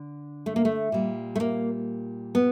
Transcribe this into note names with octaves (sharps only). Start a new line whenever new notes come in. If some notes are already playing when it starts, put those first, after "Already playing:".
Already playing: D3
A3
A#3
A3
A#2 G3
A3
A#3
B3